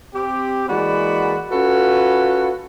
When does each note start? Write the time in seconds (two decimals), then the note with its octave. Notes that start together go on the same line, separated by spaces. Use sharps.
0.14 C4 G4
0.69 E3 G#3 A#3 F#4 D5 B5
1.52 C#4 F4 F#4 A4 B4